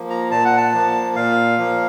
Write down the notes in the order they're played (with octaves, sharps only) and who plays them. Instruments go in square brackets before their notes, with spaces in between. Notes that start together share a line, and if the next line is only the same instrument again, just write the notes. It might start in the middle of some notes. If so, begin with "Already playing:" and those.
Already playing: [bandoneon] F3 A#3
A#5
A#2 A5
F#5
A5
F3 A#3
A#2 F5
F3 A#3